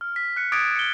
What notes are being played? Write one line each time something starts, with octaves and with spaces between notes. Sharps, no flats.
F6
B6
F#6 C#7
D6 D#6 F#6 G#6 A6 D7
C#7 G7